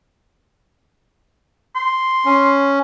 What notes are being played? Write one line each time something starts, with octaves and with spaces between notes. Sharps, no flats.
C6
C#4